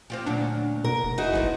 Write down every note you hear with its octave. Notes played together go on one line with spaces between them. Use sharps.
C4 F4 G4
D2 A#2 F#3 D4
B2 A#4
F1
D#4 E4 F#4 G#4
A#1 G#2 F3 B3